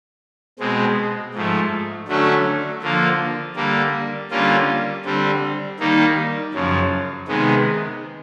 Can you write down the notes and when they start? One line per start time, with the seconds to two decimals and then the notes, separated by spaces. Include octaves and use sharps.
0.59 B2 G#3 C4
1.34 G#2 F3 A3
2.08 D3 F#3 A3 C#4 F#4
2.82 D3 F3 A#3
3.56 D3 G3 A#3
4.30 D3 G3 A#3 C#4 F4
5.05 D3 G3 C4
5.80 D#3 G3 A#3 D#4
6.53 F#2 C#3 F3
7.28 C3 D#3 G#3 B3